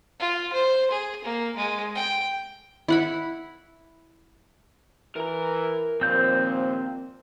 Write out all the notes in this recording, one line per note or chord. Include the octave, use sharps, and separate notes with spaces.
F4
C5
G#4
A#3
G#3
G5
E4 F#5 B5
E3 A#4 A#5
D#2 A#2 F3 C4 G6